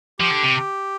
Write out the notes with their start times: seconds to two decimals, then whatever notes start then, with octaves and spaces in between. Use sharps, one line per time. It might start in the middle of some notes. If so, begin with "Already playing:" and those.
0.20 F3 G4
0.31 D3
0.43 C3